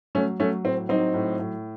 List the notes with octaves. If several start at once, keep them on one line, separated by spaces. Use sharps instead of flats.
F#3 A3 C#4
F#3 A3 C#4
A2 C4
F#3 C4 D#4
A2
A2